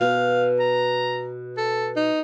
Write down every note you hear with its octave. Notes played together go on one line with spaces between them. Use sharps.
B2 F5
A#5
A4
D#4